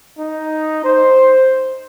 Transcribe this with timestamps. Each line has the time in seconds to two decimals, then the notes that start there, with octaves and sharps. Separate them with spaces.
0.19 D#4
0.84 C5